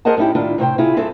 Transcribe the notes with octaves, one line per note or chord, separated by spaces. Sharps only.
G#4 A#4 C5 D#5 F#5 A5
A2 C#4 D#4 E4 G4
A2 D#3 D4 E4 F4
A2 C3 C5 G5
C3 E4 F4 G#4
G2 C4 G#4 A4 E5